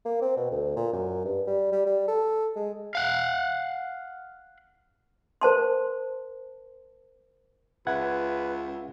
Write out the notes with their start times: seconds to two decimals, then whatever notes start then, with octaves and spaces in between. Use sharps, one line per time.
0.05 A#3
0.22 C4
0.37 B2
0.51 D2
0.76 A#2
0.93 F#2
1.25 G2
1.47 G3
1.72 G3
1.86 G3
2.08 A4
2.56 G#3
2.95 F5 F#5
5.41 A#4 C5 A5 C6
7.87 C#2 B4 E5 F#5 G#6